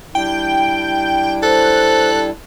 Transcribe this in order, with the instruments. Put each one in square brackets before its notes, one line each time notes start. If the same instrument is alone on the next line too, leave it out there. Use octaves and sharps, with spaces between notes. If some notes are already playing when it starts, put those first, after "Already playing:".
[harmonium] G3 D4 E4 [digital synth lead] G5
[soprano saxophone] A4 [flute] C5 [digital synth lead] F#6